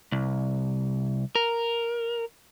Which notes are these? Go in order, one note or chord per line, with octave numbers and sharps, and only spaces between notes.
C2
A#4